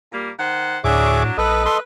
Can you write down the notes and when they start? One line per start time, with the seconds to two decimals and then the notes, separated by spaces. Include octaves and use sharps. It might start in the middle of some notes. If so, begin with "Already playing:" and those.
0.10 A#2 G3 A#3
0.37 D#3 C5 F#5
0.84 D2 A2 F#3 D4 G#4 C#5 E5 D6
1.38 A#1 A4 B4 D#5
1.65 A4 C6